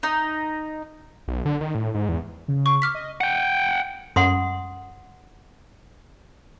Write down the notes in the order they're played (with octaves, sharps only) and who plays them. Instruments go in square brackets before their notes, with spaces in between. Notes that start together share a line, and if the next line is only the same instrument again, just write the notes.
[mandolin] D#4
[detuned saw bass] B1
D3
D#3
A2
G#2
E2
[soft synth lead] C#3
[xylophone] C#6
D6 F6 B6
[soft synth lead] D#5
[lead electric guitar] F#5 G5
[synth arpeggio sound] F#2 [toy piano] F#5 C6 D#6